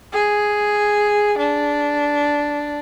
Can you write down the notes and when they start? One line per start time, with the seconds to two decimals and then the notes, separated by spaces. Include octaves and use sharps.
0.13 G#4
1.38 D4